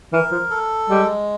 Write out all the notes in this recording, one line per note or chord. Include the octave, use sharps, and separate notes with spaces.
E3 A#4
F3
A4
G3 G#3